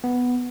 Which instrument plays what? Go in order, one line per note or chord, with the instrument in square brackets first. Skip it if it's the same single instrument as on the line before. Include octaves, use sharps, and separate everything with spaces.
[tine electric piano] B3